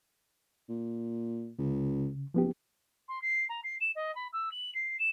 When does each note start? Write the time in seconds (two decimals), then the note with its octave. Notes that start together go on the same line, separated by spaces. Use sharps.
0.69 A#2
1.59 C#2 C#3
2.34 F#1 F3 B3 G4
3.08 C6
3.22 C7
3.49 A#5
3.64 C7
3.81 E7
3.95 D#5
4.15 B5
4.33 E6
4.52 F#7
4.75 C7
4.99 E7